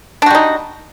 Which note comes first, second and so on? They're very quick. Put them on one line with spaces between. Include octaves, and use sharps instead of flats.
D4 F#4 G3 D#4